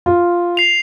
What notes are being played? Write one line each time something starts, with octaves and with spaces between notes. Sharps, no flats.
F4
C7 F7